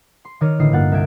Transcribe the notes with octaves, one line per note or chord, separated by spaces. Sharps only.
C6
D#3 C#5 D6 F6 A#6 D#7
A1 D3 E4 D#5 C7
G2 A#3 F4 F#5 F#6 A6
C2 E5 G6 G#6 D7